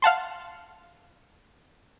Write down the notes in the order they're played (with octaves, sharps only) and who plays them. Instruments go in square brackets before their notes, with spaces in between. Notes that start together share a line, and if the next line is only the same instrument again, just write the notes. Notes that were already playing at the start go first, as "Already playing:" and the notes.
[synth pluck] F5 F#5 A5 C6